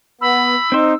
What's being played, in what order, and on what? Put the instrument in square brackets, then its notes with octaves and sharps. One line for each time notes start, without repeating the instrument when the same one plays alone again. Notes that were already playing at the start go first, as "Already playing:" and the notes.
[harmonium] B3 [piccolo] B5 [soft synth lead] E6
[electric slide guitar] C4 C5 [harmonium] D#4